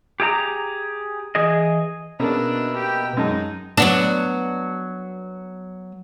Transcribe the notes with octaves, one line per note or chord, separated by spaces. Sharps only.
G4 G#4 D#5 A#5
E3 G#4 D#5
B2 A#3 B3 C#4 D4 G#4 A#4 E5
G4 G5
F#2 G#3 D#4 A5
F#3 B3 D4